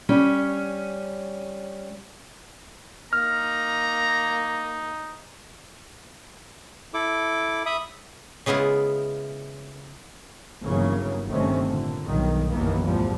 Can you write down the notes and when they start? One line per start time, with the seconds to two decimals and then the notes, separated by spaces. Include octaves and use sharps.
0.09 G3 C#4
3.13 A#3 D#4 A#5 F6
6.94 E4 A4 D6
7.66 E5 B5 D#6
8.46 C#3 G#3 B3 E4 F4
10.64 G1 C#3 E3 F#3 A#3
11.31 G1 C3 D#3 A3 C4 C#4
11.69 A#2 D3
12.07 B1 G2 D#3
12.50 F#1 D#2 D#3 E3 A#3 B3
12.85 E2 A2 F3 G3 B3